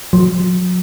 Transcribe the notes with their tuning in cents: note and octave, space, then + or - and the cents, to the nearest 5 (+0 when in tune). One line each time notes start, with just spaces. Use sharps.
F#3 -40